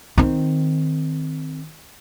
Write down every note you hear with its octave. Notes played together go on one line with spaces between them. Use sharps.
D#3 C4